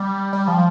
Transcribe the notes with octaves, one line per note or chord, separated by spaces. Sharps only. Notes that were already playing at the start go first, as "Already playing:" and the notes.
Already playing: G3
G3
F3